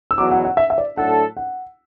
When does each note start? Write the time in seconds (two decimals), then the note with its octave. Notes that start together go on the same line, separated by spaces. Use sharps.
0.11 E6
0.18 E2 B2 F#3 D6
0.31 F#5
0.45 F#5
0.57 E5
0.70 E5
0.78 D5
0.97 A2 F#3 A3 D4 A4 F#5
1.37 F#5